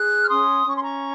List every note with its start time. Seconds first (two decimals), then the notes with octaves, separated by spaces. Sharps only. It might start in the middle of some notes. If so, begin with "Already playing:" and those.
Already playing: G#4 F#6
0.23 F6
0.28 C#4 C6 D#6
0.67 C#4 C#6
0.74 C6
0.82 A#5 C#6